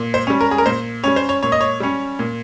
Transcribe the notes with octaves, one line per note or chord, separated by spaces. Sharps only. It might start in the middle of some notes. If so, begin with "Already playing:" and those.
Already playing: A#2
C5
G3 C#4
A#4
G#4
A#4
A#2 C5
G3 C#4 C#5
C5
C#5
A#2 C#5
D#5
C#5
G3 C#4
A#2